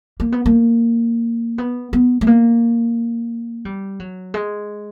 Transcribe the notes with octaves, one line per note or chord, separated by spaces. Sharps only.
A#3
B3
A#3
B3
B3
A3
A#3
G3
F#3
G#3